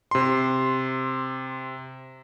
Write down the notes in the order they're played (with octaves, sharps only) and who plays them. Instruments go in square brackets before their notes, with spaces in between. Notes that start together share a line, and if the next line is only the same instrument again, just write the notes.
[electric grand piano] C3 C6